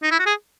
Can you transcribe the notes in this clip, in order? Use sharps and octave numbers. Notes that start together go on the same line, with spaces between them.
D#4
E4
F#4
G#4